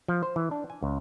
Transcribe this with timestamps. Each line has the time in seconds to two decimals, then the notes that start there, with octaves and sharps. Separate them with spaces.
0.08 F3
0.23 C5
0.36 E3
0.51 D4
0.70 G#5
0.83 C#2